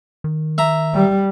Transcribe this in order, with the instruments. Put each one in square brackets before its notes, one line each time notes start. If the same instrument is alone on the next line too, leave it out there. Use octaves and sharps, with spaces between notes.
[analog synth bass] D#3
[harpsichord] E5 A#5
[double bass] G3